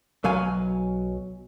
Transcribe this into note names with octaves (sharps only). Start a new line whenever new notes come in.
B1 F#3 F5 G#5